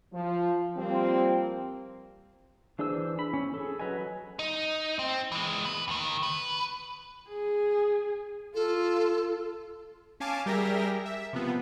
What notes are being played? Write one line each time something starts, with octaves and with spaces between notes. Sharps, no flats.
F3
F3 G3 A#3 C4
E3 D4 G#4 C5 E6
B5
C#4
G#4 A4
F#3 B4 C#5 D#5 G#5
D#4
C4
E3 G#3
B4
D#2 D#3
B4
G#4
F4 A4
C#4 F5 G#5 A5 D6
G3 G4 G#4 A#4 E5 A#6
E5
C3 F3 B3